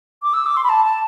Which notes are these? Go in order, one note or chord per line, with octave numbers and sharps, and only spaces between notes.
D6
E6
D6
C6
B5
A5
A5